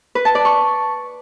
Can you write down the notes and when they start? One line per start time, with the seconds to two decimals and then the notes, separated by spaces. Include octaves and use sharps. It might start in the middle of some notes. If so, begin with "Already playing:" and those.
0.15 B4
0.25 A5
0.35 D5
0.45 C#6